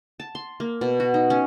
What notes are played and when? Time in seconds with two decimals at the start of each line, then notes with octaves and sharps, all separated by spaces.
0.20 A5
0.35 C6
0.60 A#3
0.81 B2
1.00 F#4
1.14 D#4
1.30 C#4